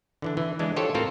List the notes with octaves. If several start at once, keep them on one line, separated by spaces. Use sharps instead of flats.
D3 E3 D4
E3
E3 G#3 D4
F4 G4 A4 C5 C#5
A2 C4 F4 A4 A#4